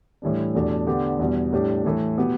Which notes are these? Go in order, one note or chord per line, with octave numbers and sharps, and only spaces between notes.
A2 E3 G3 D4
E2 B2 A3 D4 G4
D3 B3 D4 G4
E2 B2 G3 B3
A2 G3 D4 G4
A2 E3 A3
B2 B3 G4